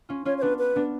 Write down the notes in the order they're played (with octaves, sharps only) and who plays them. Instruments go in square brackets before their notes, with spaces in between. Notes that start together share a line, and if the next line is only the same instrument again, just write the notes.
[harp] C#4 F4
[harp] C#4 F4 [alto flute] C#5
[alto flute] C#5
[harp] B3 D4 [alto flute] B4
[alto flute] B4
[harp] B3 D4